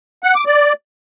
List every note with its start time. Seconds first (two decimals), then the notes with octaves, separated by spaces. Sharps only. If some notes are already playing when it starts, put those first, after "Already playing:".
0.24 F#5
0.35 D6
0.47 D5